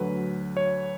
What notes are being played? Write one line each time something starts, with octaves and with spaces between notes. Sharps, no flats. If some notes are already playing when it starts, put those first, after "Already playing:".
Already playing: D2 D3 F#3 B4
C#5